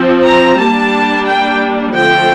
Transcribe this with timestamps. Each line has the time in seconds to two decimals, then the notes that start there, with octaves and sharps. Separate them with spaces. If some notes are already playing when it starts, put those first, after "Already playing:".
Already playing: F3 C4
0.25 A#5
0.58 G3 A#3 D4 A5
1.26 G5
1.94 D3 F3 A3 C4 G5